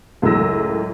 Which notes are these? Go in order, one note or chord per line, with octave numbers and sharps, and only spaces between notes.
C#2 F#2 A2 E6 A#6